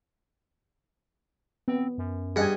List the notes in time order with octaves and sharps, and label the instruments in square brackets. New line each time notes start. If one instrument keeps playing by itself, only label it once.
[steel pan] B3 [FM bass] C4
[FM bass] F#2
[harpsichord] G2 F#5 [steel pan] G#4 D#5 G#5